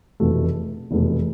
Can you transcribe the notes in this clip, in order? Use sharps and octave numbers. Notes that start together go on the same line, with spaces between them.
F1 E2 B2 A3
F1 E2 B2 A3